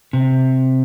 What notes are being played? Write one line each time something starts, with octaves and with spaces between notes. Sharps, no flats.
C3